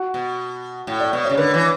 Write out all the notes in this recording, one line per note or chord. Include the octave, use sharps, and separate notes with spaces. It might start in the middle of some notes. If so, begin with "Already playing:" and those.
Already playing: F#4
B2
A2
D5
B2 D5
C#3 C#5
D3 B4
E3